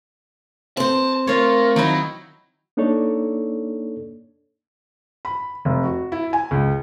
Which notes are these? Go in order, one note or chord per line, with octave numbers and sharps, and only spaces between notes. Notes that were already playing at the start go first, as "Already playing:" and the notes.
C4 C5 A5
A3 F4 A#4 C#5
D#3 F#3 D#4 E4
A#3 D4 D#4 A4 C#5 D5
B5
F1
F#4
E4
G#5
C#2